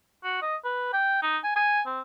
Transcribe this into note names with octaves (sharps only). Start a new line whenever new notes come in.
F#4
D#5
B4
G5
D#4
G#5
G#5
C4